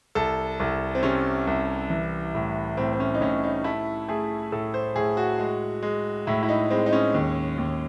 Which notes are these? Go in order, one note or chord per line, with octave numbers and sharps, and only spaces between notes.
C2 A4
C2
C4
C3 C#4
C2
E3
A2
A2 C4
C4
C#4
D#4
A2 C#4
D#4
A3 E4
A3 G#4
A2 A4
C5
A2 G#4
F#4
G#3
G#3
A2 E4
E4
D#4
G#3 C4
D#4
C#4
D#2
D#2